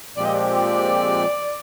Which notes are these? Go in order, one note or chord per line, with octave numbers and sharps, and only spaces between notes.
A#2 F3 G#3 C4 G4 D5
D#5
D5